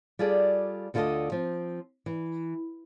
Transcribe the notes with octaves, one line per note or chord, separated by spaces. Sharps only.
G3 F4 G#4 A4 D5
D2 D3 F4 G#4 A4 D#5
F3 C4
E3